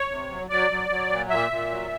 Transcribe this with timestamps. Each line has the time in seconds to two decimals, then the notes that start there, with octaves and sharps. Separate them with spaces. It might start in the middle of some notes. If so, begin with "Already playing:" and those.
Already playing: C#5
0.11 C3
0.30 F#3
0.50 F#3 D5
0.71 F#3
0.90 F#3
1.10 A#2
1.30 A#2 E5
1.51 A#2
1.71 F#3